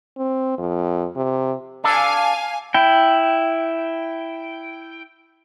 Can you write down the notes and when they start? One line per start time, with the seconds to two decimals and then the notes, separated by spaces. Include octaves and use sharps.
0.17 C4
0.58 F2
1.16 C3
1.84 D4 A4 F5 G#5
2.74 E4 G5